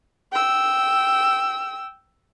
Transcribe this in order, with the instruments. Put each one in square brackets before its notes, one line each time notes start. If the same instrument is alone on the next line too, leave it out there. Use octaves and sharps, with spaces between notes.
[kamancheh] G5 E6